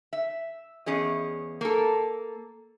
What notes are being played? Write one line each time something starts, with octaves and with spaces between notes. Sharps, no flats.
E5
E2 C#4 G#4 D#5
A#3 A4